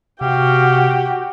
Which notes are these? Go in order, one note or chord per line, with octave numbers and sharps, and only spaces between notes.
C3 F#4 G4 F5 G5